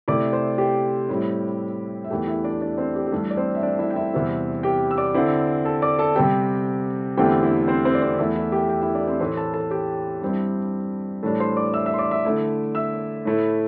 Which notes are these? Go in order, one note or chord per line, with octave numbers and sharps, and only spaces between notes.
C3 A3 E4 D5 D6
C5 C6
G4 G5
A2 G3 C4 E4
E5
E2 E3 A3 G4 G5
E4 E5
D4 D5
D4 D5
C4 C5
G4
G4
G2 E3 A3 A4
D5
C4 C5
E5
D4 D5
E4 E5
G5
E4 E5
E2 C3 G3 C4 E4
G4 G5
E6
D5 D6
D3 C4 E4
A4 A5
D5 D6
A4 A5
C3 G3 C4 G4 G5
E2 D3 A3 C4 E4 G4 G5
E4 E5
C4 C5
C4 C5
D5
C4 C5
E2 E3 A3 E4 E5
E4 E5
G4 G5
G4 G5
E4 E5
D4 D5
C4 C5
A2 E3 A3 C5 C6
A4 A5
A4 A5
G4 G5
G2 G3 C4 E4
A2 E3 G3 D4 A4 A5
C5 C6
D5 D6
E5 E6
E5 E6
C6
D5 D6
E5 E6
D3 A3 E4
E5 E6
A2 A3 E4